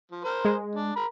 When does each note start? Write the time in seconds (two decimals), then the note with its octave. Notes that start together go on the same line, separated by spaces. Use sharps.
0.11 F3
0.25 A#4 C5
0.45 G#3
0.75 D4
0.96 A#4 A#5 B5